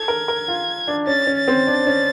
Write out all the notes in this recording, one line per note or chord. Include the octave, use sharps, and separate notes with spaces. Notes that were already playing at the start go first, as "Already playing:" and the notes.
Already playing: A4 G#6
A#4
A#4
F4
D4
C#4 A6
C#4
A6
C4
D4
C#4